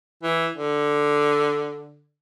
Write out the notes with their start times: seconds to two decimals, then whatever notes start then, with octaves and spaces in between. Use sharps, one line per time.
0.23 E3
0.56 D3